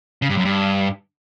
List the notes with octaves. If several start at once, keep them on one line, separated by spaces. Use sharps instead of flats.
C#3
G2
F#2
G2